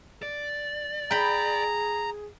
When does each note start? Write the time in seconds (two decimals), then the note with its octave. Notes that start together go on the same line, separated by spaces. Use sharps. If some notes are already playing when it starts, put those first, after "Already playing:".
0.23 D5
1.11 G#4 G5 A#5 B5